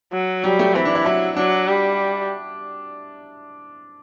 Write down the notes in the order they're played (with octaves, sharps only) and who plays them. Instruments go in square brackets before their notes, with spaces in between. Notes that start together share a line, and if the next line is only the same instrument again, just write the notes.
[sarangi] F#3
[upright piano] F#3 [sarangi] G3
[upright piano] A3
[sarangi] E3 [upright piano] C4
[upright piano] D4
E4
[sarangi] F#3 [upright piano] E4
[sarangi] F#3 [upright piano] D4
[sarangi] G3